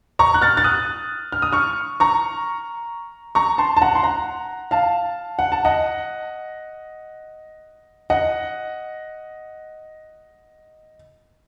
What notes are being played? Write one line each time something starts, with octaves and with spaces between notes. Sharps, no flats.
A#5 C#6
F#6
F6 A6
A6
D#6 F#6
F6
D#6
C#6 F6
A#5 C#6
A#5 C#6
A5 C6
A5
F#5 A#5
C6
F#5 A#5
F5 A5
F#5
A5
D#5 F#5
D#5 F#5